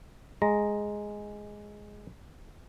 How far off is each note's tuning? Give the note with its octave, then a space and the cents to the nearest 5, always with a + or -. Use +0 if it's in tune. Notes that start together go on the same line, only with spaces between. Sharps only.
G#3 +0 A#5 +5